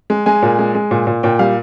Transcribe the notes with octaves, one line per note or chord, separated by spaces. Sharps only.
G#3
G#3 G#5
A#2
G#3
G#3
A#2
A#2
A#2 G5
G3 F5